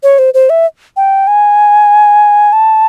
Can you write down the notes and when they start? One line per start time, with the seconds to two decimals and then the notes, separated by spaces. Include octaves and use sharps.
0.03 C#5
0.19 C5
0.34 C5
0.50 E5
0.97 G5
1.27 G#5
2.53 A5